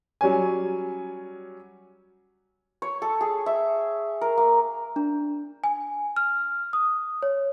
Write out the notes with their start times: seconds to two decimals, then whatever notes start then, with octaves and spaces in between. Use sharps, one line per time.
0.21 F#3 G3 C#4 G#5
2.82 C#5
3.02 A4
3.21 G#4
3.46 E5
4.21 A#4
4.37 A#3
4.96 D4
5.64 G#5
6.16 F6
6.73 D#6
7.23 C#5